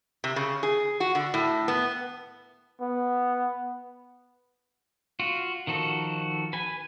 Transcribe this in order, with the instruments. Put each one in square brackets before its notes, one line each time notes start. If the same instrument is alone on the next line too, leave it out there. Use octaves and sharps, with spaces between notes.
[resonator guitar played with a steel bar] C3
C#3
G#4
F#4
D3
A2
B3
[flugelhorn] B3
[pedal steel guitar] F4 F#4
D#3 F3 F#4 A4
B4 G#5